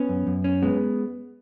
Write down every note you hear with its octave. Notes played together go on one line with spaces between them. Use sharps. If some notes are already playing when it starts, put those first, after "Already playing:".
Already playing: B3 C#4
F#2
F#2
C#4
G#3 B3